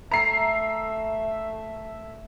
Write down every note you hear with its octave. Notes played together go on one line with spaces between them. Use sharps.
A3 E5 A#5 C7